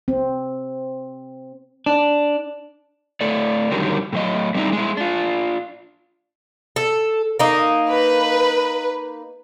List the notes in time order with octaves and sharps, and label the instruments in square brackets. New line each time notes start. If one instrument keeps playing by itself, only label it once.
[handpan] C4
[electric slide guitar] D4
A2 A4 D5
F#2 D3 D#3 F#3 G3
A2 F#3 D#5
G3 C4 D#4 E4
G#3 E4
D4 F4
[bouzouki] A4
A#3 D#4
[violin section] B4